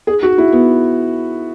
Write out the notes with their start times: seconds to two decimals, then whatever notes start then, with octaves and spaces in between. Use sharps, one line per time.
0.07 G#4
0.23 F#4
0.38 E4
0.52 B3